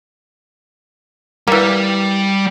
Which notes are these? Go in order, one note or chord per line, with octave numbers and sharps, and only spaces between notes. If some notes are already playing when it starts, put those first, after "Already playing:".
E3 G3 A#3